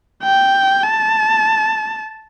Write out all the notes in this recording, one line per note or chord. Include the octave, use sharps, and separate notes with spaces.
G5
A5